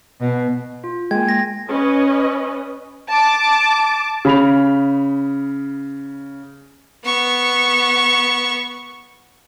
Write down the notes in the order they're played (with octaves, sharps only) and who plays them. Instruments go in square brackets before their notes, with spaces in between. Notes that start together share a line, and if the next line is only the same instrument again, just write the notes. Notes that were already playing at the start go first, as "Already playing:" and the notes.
[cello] B2
[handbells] F4
[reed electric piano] G#3 A#3 [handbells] G5 G#5 [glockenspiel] G#6
[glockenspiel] A#6
[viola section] C#4 B4 D#5
[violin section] A5 D6
[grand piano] C#3 B5 F7
[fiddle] B3 C#6